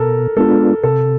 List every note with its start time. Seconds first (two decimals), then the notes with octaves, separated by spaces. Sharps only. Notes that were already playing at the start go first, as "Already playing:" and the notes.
Already playing: B2 A4 A#4
0.37 G#3 B3 D4 F4 A4
0.83 C3 A4